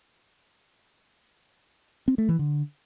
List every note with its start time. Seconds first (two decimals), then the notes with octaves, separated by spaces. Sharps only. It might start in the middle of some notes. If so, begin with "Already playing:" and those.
2.08 C4
2.18 A3
2.29 E3
2.39 D3